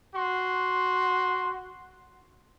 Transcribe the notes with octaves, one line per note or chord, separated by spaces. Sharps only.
F#4 C6